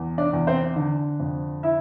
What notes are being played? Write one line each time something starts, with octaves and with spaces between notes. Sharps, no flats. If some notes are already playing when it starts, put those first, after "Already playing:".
Already playing: E2
D4 D5
E2
C4 C5
D3
F2
E4 E5